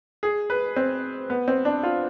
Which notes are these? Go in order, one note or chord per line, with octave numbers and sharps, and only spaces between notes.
G#4
B4
C4
B3
C4
D4
F4